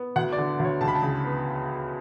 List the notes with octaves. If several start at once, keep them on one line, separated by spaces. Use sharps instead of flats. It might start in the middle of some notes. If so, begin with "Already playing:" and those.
Already playing: B3
D2 F#5
D5
D3
D2
C#5
C#2 A5
B5
A5
C#3
B3